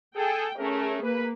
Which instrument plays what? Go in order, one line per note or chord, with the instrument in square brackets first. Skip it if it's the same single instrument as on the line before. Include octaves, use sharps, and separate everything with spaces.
[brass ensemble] G#4 A4 [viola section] G5
[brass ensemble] A3 A#4 [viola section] C#4 G#4
[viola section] A#3 [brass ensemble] B4